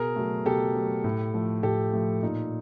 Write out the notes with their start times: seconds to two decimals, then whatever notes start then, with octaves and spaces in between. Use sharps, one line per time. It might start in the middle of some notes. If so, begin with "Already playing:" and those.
Already playing: B2 G#4 A#4
0.16 F#3 A3
0.46 B2 G4 A4
0.75 F#3 A3
1.04 A2
1.34 F3 A3
1.63 A2 G4 A4
1.93 F3 A3
2.23 A#2 D#4